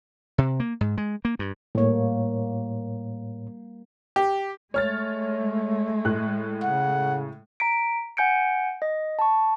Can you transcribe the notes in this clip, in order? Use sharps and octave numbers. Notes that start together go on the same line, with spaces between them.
C3
A#3
G#2
G#3
A#3
G2
A2 G3 A#3 C#5
G4
G#3 A3 C#5 F6 A6
A2 F#6
C#3 F#5
A#5 B6 D7
F#5 G#5 G6 C#7 D7
D#5
A5 C#6